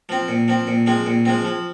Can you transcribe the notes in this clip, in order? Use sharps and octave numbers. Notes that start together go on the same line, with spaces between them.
F3 C4
A#2
F3 C4
A#2
F3 G#3 C4
A#2
F3 G#3 C4
F3